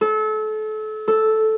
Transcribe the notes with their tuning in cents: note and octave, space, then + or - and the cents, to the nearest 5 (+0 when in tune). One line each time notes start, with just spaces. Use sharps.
A4 -30
A4 -5